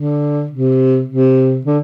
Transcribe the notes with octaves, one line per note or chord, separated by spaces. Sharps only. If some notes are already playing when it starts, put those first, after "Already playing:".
Already playing: D3
C3
C3
D3